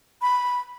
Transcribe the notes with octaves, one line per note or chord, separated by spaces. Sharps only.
B5